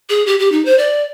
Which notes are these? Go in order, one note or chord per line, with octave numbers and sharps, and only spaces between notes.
G#4
G4
G4
D#4
C5
D5